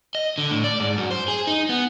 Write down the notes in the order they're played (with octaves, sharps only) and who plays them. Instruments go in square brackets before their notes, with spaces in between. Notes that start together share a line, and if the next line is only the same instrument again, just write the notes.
[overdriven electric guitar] D#5
D3
A2
D5
G#2
F#2
C5
G#4
D#4
B3